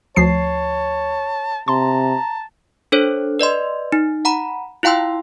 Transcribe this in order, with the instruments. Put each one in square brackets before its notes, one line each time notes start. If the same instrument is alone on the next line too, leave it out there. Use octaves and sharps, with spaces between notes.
[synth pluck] D2 F3 C7 [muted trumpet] C#5 [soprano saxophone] A5
[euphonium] C3 [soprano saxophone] A5 [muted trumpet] A#5 [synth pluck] C6
[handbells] D4 A4 C5 C#5
B4 D5 D#5 C6
D#4
F#5 A#5 B5
E4 F4 F5 G5 C6 E6